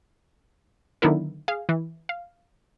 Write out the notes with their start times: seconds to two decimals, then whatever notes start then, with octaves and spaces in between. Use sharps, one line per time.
1.02 D3 D#3 F#3 B3 E4 A#4
1.48 G#4 F5
1.69 E3
2.09 F5